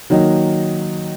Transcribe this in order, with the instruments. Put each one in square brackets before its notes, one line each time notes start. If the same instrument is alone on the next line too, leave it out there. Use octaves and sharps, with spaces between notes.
[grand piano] D#3 F#3 A#3 D#4